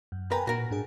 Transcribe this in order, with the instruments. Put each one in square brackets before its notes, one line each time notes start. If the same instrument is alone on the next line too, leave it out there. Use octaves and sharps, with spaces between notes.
[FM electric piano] F#2
[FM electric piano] A#4 G5 G#5 [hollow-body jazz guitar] B4 A#5
[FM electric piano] A#2 [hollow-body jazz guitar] F#4 A#4
[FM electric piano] G#2 D4 G#4